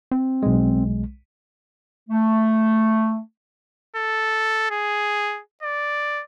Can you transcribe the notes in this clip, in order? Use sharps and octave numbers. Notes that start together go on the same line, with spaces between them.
C4
B1 G#3
A3
A4
G#4
D5